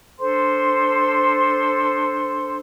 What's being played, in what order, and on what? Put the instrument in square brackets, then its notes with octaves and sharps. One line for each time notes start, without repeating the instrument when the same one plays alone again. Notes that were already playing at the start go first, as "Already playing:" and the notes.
[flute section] D4 A4 C5 C6